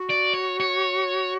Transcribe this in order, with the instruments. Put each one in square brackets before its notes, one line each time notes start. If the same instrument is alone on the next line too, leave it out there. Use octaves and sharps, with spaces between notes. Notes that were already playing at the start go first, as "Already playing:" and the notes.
Already playing: [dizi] F#4
[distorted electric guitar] D5
C#5
C#5